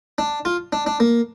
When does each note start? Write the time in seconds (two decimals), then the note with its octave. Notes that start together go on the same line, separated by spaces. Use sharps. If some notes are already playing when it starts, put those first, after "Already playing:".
0.18 D4
0.45 F4
0.73 D4
0.87 D4
1.00 A#3